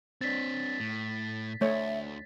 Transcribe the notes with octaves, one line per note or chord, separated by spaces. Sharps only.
C4 D4 A6 B6
A2
D2 A3 C#5 E5